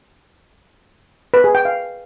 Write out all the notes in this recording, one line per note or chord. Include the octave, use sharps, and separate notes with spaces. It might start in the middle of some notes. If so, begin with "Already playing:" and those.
B4
G#4
G5
F5